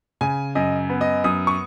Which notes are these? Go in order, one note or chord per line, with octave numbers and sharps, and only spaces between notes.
C#3 G#5
F#2 D#5
B3
D#5
F#2 D#6
C#6